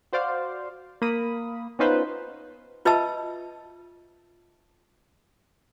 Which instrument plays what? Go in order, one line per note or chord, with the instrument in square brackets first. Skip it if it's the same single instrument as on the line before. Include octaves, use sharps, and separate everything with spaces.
[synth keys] F#4 C5 D5 F5
A#3 B5 D#6
B3 C#4 D#4 F4 B4 C5
[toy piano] F4 B4 D#5 E5 A5 E6